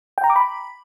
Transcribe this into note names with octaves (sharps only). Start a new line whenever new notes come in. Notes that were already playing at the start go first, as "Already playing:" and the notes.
G5
A#5
D6
B5